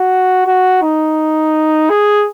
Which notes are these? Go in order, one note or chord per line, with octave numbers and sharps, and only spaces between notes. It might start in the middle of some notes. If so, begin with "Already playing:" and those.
Already playing: F#4
F#4
D#4
G#4